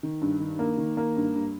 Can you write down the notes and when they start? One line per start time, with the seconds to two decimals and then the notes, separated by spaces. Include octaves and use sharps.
0.03 D#3
0.21 G2
0.40 D#3
0.59 A#3
0.78 D#3
0.97 A#3
1.16 G2
1.35 G2